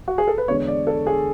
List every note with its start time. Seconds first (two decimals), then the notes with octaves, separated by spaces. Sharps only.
0.08 F#4
0.18 G#4
0.28 A4
0.38 B4
0.48 E2 D3 G#3 C#5
0.68 D5
0.87 A4
1.07 G#4